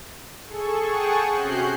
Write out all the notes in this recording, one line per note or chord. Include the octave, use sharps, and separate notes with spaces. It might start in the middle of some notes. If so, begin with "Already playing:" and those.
G#4 A4 C#6
G#4 F#5 G5 A5 C#6 D#6
C3 C#4 F#4 F#6 G6 C7